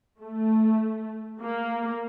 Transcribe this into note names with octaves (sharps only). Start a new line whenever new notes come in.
A3
A#3